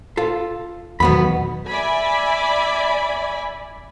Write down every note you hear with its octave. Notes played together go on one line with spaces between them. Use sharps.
F4 A4
E2 B2 D#3 F#3 B3 B5
D5 E5 G#5 B5